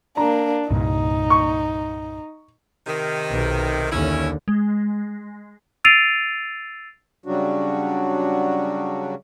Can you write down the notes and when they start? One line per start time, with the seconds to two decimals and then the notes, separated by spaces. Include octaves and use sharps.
0.17 A#3 D4 A#5
0.70 C2 G2 A#2 D#4
1.30 C#6
2.87 C3 D#3
3.30 B1
3.91 D#2 D3 C#4 E4
4.48 G#3
5.85 E6 A6 C7 D7 D#7 F7
7.26 C#3 F#3 G3 D4 F#4